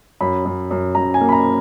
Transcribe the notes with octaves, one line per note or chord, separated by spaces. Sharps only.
F#2 B5
F#2
F#2
F#2 A#5
G#5
A#3
B5
A#5